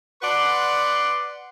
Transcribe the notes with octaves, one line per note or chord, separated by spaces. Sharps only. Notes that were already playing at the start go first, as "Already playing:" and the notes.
B4 D5 F#5 C6